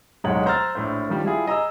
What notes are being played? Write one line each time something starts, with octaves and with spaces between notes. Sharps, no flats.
D1 B1 G#2 D#4 C#5 F#7
C5 A#5 E6 F6 A6
A#1 A2 C5
D#3 F3 G3
G3 E4 F4 G#4
G#4 D#5 A#5 D#6 E6